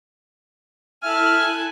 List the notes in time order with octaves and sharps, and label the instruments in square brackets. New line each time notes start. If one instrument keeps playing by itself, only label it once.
[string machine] E4 A4 F#6 [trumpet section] E5 [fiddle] G#5 A5 [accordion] F6